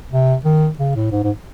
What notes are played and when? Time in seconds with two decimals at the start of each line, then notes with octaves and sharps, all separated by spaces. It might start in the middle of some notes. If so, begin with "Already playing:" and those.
0.12 C3
0.45 D#3
0.79 C#3
0.96 A2
1.12 G#2
1.23 G#2